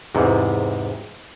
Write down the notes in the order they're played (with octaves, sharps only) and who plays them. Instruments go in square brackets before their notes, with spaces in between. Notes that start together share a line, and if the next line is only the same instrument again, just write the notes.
[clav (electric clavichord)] E2 G#2 C3